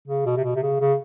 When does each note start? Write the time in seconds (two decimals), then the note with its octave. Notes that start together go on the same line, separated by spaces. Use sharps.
0.08 C#3
0.26 B2
0.37 C3
0.44 B2
0.56 C3
0.62 C#3
0.80 C#3